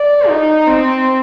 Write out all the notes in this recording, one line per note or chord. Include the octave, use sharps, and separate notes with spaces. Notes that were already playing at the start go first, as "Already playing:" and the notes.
Already playing: D5
D#4
C4